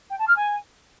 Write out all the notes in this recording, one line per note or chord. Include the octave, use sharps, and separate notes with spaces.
G5
A5
F6
G#5